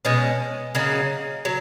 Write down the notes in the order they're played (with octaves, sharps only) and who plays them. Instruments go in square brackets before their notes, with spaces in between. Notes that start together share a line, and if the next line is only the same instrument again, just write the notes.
[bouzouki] B2 G#3 C#4
C#3 F#3 A#3 D#4
F#3